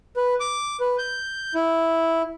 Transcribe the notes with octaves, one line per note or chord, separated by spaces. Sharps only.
B4
D6
B4
G6
E4